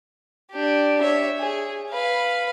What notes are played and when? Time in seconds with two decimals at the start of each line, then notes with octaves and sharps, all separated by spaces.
0.52 D4 G4
1.02 C#5 E5
1.39 G#4
1.91 B4 F5